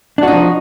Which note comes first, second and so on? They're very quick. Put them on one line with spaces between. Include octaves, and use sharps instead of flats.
D4 F#4 D#4 F3